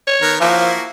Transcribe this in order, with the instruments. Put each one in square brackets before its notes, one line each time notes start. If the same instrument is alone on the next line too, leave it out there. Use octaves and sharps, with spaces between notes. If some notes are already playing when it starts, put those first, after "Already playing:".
[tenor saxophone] C#5
[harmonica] D#3 B3 A#4
[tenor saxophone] F3 [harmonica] A#3 E4 F#4